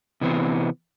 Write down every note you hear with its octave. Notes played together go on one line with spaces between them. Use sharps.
C3 E3 B3 C4